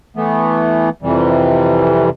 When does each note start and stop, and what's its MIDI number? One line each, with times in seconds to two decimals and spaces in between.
0.16 0.89 52
0.16 0.89 57
0.16 0.89 59
1.03 2.09 41
1.03 2.09 48
1.03 2.09 52
1.03 2.09 55